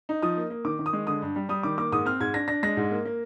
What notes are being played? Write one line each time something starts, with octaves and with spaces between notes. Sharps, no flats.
D#4
F3 D#6
A#3
A#3
D#3 D6
D#3
D#6
G#3
D3 D#6
G2
G3
G3 D#6
D#3 D6
A#3 D6
G#2 D#6
C4 F6
G#2 G#6
D4 A#6
D4 A#6
G#3 A#6
G#2
A#3
A#3